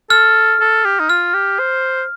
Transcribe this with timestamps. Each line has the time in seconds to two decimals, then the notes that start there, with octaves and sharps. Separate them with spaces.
0.10 A4 F6
0.60 A4
0.85 G4
1.00 D#4
1.10 F4 F6
1.34 G4
1.59 C5